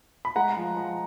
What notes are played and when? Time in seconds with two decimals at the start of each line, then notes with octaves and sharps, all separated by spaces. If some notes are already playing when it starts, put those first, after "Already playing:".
0.25 B5
0.36 G#3 F#5 A#5
0.57 F3
0.77 F3